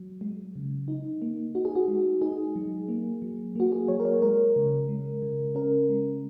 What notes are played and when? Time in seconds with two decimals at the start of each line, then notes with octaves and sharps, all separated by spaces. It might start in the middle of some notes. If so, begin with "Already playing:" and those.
Already playing: F#3
0.21 G#3
0.56 C#3
0.88 D#4
1.22 A#3
1.55 D#4 F#4
1.65 G#4
1.75 F#4
1.88 G#3
2.21 D#4 G#4
2.56 F#3
2.89 A#3
3.22 F#3
3.56 A#3 F#4
3.72 G#4
3.88 F#3 C#5
4.00 A#4
4.05 C#5
4.22 G#3 A#4
4.56 C#3
4.88 G#3
5.22 C#3
5.55 C#4 A#4
5.89 G#3